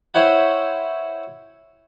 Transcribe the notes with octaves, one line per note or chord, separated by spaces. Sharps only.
E4 C5 C#5 F#5 G5 B5